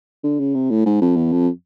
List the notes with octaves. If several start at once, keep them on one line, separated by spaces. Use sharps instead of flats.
D3
C#3
C3
A2
G#2
F2
E2
F2